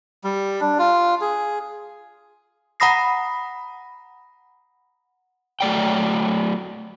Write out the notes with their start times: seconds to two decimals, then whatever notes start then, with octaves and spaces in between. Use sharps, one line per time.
0.24 G3
0.61 D4
0.79 F4
1.21 G#4
2.80 F#5 A#5 B5 D#6 A#6 C7
5.61 F#3 A3 D5 G5